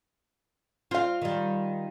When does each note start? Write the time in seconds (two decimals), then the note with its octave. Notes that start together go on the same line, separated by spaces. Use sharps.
0.91 C4 F4 F5
1.22 D#3 G3